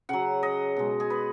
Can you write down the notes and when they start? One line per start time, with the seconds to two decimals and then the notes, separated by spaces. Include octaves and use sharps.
0.09 C#3 F#3 F#5
0.43 D#5
0.76 B2 G#3
1.00 G#4
1.10 B4